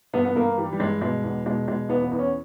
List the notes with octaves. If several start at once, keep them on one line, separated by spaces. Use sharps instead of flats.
G2 B3
B3
G2 A#3
E3 G3
G3
G2 G#3
B2 G#3
E2
B2 G#3
B2 G#3
E2 B3
B3
E2
C#4